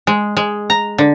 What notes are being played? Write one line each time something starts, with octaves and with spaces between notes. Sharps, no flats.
G#3
G#3
A#5
D3